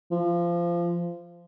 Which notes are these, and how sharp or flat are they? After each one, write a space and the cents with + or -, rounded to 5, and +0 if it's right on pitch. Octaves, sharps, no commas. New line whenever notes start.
F3 -20